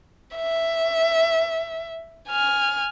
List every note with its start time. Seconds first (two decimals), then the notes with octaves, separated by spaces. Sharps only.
0.36 E5
2.29 G#5 F6